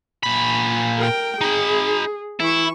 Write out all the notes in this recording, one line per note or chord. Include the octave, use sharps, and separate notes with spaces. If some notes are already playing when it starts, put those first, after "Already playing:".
A#2 B5
A#4 G5
D#4 G#4 B5
E3 E4 C#6